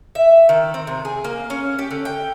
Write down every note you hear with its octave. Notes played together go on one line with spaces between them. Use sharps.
E5
D#3
C4
C3
G#4
A#3
C#4
G4
D3
G5